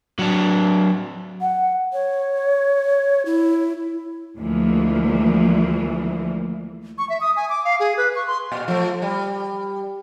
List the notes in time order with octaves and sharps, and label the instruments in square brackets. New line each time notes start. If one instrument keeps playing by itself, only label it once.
[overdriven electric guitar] F#3 D4
[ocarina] F#5
C#5
E4
[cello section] D2 E3 F3 G#3 A#3
[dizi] C#6
E5
D#6
G#5
D6
F5
G#4
B4
C#6
C6
[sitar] A#2
F3 A3
G3